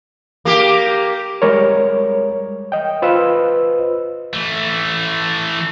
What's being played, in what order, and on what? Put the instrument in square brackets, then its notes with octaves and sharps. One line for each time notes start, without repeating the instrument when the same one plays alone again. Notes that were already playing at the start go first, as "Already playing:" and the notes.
[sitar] A#3 G4
[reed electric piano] G3 G#3 A#4 C#5
D#5 G5
F4 B4 C5 D#5 E6
[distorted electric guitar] E3 A3